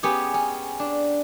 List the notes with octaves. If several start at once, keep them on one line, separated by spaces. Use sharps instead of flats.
B3 C#4 G4 G#4
C#4
D4